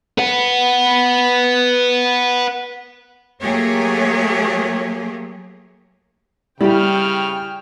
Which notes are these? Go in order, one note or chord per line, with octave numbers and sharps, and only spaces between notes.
B4 F#5
F#3 A3 A#3 G4 G#4 C#5
C#3 G3 E4 G4 G5 F6